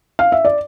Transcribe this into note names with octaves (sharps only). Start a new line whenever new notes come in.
F5
E5
D5